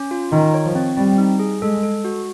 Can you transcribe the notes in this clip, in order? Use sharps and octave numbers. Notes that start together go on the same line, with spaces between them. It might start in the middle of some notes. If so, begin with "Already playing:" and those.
Already playing: C#4
F4
D#3 D#4
C#5
F3
C4
G3 C4
D#4
G#4
G#3 A4
A4
F#4